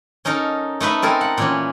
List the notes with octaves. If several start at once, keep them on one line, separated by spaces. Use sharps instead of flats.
C#4 D#4 A4 A#4
A3 D#4 B4 E5
C4 A4 A#4 G#5
F#5
A#2 E3 C#4